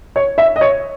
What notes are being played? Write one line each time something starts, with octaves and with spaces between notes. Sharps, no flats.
C#5
E5
D#5
C#5